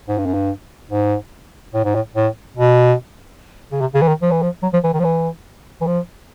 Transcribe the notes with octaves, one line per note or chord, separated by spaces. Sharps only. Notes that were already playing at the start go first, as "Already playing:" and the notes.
G#2
G2
F#2
G2
G#2
A2
G#2
A2
A2
B2
C#3
C3
C#3
E3
D#3
F3
E3
F3
F#3
F3
E3
D#3
F3
E3
E3
F3